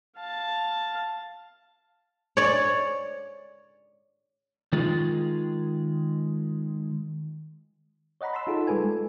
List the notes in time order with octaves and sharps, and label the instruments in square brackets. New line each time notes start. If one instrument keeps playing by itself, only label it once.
[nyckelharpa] F5 A5
[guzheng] C#5 D5
[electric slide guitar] D#3 G#3 F4 G#4
[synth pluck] C#5 D#5 F#5 A#5 B5
A5 B5 C6 E6
D#4 F4 G#4 A4
G3 G#3 G#4 A4 B4 G#5
G#3